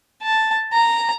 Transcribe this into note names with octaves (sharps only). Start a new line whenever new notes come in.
A5
A#5